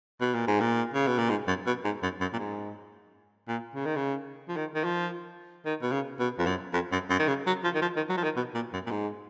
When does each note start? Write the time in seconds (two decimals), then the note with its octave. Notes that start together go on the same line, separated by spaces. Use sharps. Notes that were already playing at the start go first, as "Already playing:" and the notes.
0.21 B2
0.35 A#2
0.47 G#2
0.61 A#2
0.94 C#3
1.07 B2
1.18 A#2
1.30 G#2
1.48 F#2
1.67 B2
1.85 G#2
2.03 F#2
2.21 F#2
2.33 A#2
2.39 G#2
3.48 A#2
3.75 C#3
3.85 D#3
3.96 C#3
4.49 F3
4.57 D#3
4.75 D#3
4.84 F3
5.66 D#3
5.82 B2
5.92 C#3
6.20 B2
6.39 F2
6.46 F#2
6.73 F2
6.92 F#2
7.10 F#2
7.19 D#3
7.28 C#3
7.47 F#3
7.64 F3
7.75 D#3
7.82 F3
7.96 D#3
8.09 F#3
8.17 F3
8.24 D#3
8.37 B2
8.55 A#2
8.74 F#2
8.87 A#2
8.91 G#2